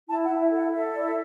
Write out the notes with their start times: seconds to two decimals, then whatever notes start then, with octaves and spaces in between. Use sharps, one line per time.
0.09 E4 A5
0.25 F#5
0.30 E4
0.41 E5
0.51 A4
0.57 F#5
0.72 A4 E5
0.93 E4 D5
1.04 E5